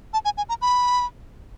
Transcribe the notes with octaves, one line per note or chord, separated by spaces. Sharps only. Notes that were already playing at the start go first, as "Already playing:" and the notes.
A5
G#5
G#5
A#5
B5